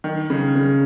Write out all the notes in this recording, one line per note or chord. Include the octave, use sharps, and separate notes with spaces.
D#3
C#3
C#3